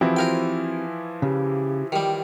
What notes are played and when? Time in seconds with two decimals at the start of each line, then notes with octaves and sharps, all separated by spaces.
0.01 E3 F3 C4 E4 F#4 G4
0.16 F4 A#4 G5
1.22 C#3 G4
1.92 D#3 G3 G4